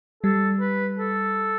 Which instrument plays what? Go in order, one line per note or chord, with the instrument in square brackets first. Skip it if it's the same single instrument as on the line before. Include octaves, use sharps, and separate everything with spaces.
[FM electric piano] G3 [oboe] A4
[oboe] B4
A4